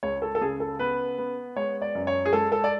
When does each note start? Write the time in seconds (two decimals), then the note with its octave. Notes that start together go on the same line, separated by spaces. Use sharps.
0.03 C#2 C#5
0.22 A4
0.35 A4
0.41 C#3 G#4
0.60 A4
0.79 B3 B4
1.18 B3
1.56 G#3 C#5
1.82 D5
1.95 F#2
2.07 C#5
2.25 G#4
2.33 G#3 A4
2.52 A4
2.64 D5